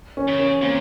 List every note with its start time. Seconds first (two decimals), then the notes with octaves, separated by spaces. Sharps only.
0.17 C#4
0.28 C#3
0.39 C#4
0.61 A#2 C4